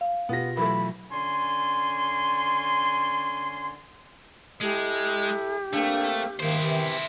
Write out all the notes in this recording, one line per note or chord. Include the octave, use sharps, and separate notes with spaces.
F5
B2 B3 F4 G4 A#6
E3 F#3 A3 B5
D3 C#4 G#5 C6
G#3 E4 G4 A4
A3 A#3 C4 D4 F5
G#2 D#3 A#3 E4 C5
C3 E3 G4